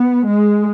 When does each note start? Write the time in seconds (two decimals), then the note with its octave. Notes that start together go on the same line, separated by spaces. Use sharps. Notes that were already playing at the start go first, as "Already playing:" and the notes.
Already playing: B3
0.24 G#3